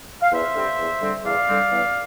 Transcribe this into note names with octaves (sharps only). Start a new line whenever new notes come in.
F5
E2 C5 E5
D3 G3 C4
E2
D3 G3 C4
E2 D5 F5
D3 G3 C4
E2